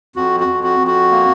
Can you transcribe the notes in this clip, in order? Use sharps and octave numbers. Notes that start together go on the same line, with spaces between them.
F2 F#4
F#4
F2
F#4
F2
F#4
A#3